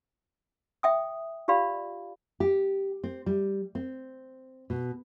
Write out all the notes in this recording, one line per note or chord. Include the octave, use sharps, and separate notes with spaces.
E5 G5 D#6
F4 G4 D5 F5 B5
G4
C4
G3
C4
B2